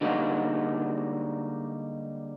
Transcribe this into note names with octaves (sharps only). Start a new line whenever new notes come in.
D3 G3 G#3 A#3 D#4 F#4